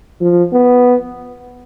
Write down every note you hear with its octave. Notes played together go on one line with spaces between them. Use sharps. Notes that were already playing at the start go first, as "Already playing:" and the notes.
F3
B3